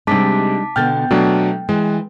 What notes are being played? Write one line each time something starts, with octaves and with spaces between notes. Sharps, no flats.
C3 G3 G#3 D4 D#4 A5 D6 B6
B2 D3 B3 G5 F6 G6 A6
B2 F#3 A3 D4
E3 G#3